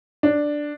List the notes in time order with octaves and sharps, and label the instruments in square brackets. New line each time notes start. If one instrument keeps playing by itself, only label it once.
[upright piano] D4